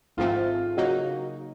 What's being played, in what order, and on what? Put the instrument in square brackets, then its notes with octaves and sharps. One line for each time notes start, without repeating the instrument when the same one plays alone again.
[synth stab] G#1 G#2 F3 A3 C4 [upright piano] F4
[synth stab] C#3 F#3 A#3 D#4 [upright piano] F#4